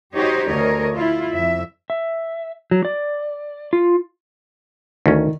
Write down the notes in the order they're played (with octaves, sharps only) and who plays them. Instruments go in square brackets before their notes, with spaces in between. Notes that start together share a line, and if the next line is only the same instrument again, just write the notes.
[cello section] D#4 F#4 G4 C5 C#5 D#5
D2 D3 A#4 C#5 D#5
E4 F4
F2 E5
[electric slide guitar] E5
F#3
D5
F4
[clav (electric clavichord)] D2 C#4 [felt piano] D#3